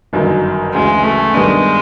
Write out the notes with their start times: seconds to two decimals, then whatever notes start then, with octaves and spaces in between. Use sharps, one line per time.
0.13 G1 F#2 D#3 F#3
0.74 D2 C#3 E3 G#3
1.04 A3
1.34 G2 D#3 G3 G#3 B3 D4